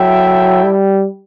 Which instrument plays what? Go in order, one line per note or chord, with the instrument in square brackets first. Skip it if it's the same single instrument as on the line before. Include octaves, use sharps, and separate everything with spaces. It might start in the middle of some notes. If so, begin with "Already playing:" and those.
Already playing: [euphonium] F#3 [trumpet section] E4 A4 E5 G5
[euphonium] G3